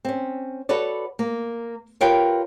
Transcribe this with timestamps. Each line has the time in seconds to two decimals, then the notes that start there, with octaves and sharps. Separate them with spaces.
0.05 C4 C#4
0.69 F#4 A4 B4 C#5 D5
1.19 A#3
2.01 F4 G4 A#4 B4 C#5 G5